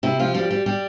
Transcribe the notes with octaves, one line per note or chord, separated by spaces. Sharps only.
C3 E4
F3 F4
G3 G4
G3
G3 G4